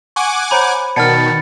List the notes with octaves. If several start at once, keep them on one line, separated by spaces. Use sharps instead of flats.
F#5 G#5 C#6 D6
C5 C#5 A#5 B5
B2 D#3 D5 F#5 A5 F6 A6 C#7